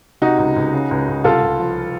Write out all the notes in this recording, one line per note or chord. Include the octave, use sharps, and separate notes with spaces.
C3 D#4 F#4
C#2
C#2
C#3
C#2
C#2
C2 F4 A4
C2
F3